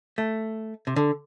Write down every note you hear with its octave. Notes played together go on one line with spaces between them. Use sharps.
A3
C3
D3